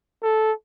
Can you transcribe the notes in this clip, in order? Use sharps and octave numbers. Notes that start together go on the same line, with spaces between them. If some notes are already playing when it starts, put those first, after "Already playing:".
A4